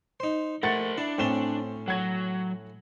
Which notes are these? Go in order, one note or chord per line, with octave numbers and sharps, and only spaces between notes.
D#4 C5
A3 A#4 C5 F#5 A6 C#7
D4 E4
A2 C4 C#4 E7 G7
F#3 F#5 G#6